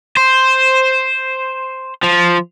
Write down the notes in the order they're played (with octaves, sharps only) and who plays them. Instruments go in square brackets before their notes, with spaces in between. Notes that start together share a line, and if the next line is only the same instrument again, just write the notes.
[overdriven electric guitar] C5
F3